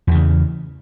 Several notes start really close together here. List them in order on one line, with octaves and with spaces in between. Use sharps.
E2 E3 C#3